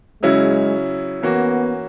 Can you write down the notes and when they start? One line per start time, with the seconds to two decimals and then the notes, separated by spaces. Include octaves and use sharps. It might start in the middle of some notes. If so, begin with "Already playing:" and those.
0.22 C#3 F#3 G#3 C#4 E4
1.23 E3 A#3 B3 C#4 F#4